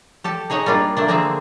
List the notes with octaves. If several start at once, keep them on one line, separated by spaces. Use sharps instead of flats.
G4 A4 A5
D#4 G#4 C#5 D#5 F#5
G3 A#3 D4 F4
A3 A#3 D4
D3 A#3 C4 G#4 E5 A5